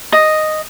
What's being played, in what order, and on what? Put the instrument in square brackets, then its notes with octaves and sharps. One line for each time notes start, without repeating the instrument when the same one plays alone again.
[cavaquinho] D#5